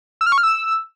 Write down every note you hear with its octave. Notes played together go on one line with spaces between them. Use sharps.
E6
F6
C#6
F6
E6